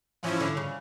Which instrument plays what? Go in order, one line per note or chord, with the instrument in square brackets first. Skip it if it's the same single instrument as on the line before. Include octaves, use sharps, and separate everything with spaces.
[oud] E3 [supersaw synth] F3 C#4 E4
[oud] D3
C#3